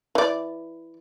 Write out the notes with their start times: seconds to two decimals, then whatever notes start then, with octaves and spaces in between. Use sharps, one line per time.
0.15 E3 D5